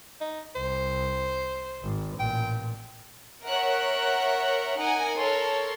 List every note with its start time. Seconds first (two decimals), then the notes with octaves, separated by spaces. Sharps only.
0.21 D#4
0.55 C2 C5
1.82 G#1
2.19 A1 A#2 G5
3.46 A#4 C#5 E5 F#5 F#6
4.80 D#4 A#4 F#5 G#5
5.18 A4 A#4 C#5 C6